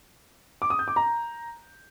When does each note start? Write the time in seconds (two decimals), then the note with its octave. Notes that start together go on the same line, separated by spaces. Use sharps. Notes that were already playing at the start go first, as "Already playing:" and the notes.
0.62 D6
0.70 D#6
0.79 G6
0.88 D6
0.96 A#5